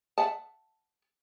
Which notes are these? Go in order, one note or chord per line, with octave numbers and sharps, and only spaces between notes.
E5 F#5 A5